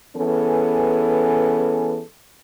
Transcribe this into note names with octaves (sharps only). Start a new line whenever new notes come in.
E3 B3 C#4 G#4 A4